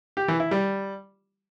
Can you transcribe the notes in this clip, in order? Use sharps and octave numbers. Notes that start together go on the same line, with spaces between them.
G4
E3
E4
G3